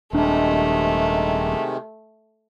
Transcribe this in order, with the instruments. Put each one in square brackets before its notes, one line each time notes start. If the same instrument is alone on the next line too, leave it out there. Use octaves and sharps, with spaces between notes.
[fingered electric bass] D#1 D4 [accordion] C3 D#3 G#3 [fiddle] A3